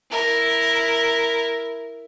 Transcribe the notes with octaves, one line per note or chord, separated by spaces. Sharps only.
E4 A#4